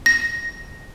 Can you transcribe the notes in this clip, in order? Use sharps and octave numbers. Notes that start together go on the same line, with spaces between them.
A#6